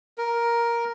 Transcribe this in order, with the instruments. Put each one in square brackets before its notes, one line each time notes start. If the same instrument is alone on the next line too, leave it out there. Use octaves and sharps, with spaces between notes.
[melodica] A#4